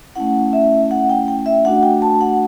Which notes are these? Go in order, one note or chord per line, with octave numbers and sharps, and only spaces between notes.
A3 C#4 E4 F#5
E5
F#5
G5
G5
E5
A3 D4 F#4 F#5
G5
A5
F#5